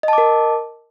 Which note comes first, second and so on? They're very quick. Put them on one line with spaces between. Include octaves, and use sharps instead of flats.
D#5 A5 D6 A#4